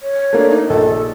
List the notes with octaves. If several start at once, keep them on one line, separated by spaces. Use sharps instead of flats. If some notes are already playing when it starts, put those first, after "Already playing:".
C#5
A3 A#3 D4
D#4
A#1 A4 D#5